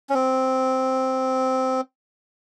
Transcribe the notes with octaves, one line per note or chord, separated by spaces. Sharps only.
C#4
C4